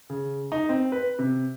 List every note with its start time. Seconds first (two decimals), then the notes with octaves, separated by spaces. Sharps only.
0.10 C#3
0.52 D#4
0.69 C4
0.92 B4
1.19 C3